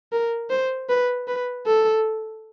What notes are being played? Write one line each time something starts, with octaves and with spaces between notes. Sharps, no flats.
A#4
C5
B4
B4
A4